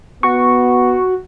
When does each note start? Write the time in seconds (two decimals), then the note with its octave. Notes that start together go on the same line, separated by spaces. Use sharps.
0.23 B3 F#4 C#6